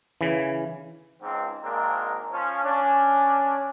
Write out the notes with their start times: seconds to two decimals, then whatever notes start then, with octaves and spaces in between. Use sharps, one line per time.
0.21 C#3 E3
1.22 C#2 G#2 C4
1.63 G#1 G#3 A#3 C4 D4 A#4
2.32 F3 C#4
2.64 C#4 D4